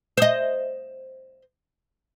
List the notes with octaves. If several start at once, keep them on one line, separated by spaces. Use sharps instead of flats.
C5 D#5